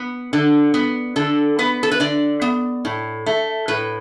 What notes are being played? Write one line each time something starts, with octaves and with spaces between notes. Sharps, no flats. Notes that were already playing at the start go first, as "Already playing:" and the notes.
Already playing: B3
D3
B3
D3 A4
B3 B4
A4
B4
D3 D5
B3
A2
A3
A2 B4